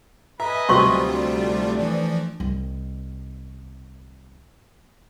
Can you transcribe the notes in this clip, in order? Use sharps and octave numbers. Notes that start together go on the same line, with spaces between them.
B4 D#5 E5 G#5 A#5
D2 C3 F#3 G3 F4 C6 C#6
A3 D4
E3 F3
C2 D#3